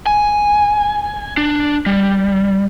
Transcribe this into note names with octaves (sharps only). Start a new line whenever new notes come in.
G#5
D4
G3